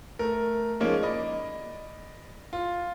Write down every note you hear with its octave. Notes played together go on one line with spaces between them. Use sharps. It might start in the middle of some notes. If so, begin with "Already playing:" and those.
A3 A#4
F3 G#3 A#3 C#4 D#4
D5 D#5 B5
F4